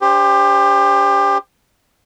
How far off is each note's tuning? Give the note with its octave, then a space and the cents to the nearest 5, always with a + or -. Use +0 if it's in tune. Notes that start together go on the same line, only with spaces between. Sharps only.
D4 -35 G4 +25 C5 +0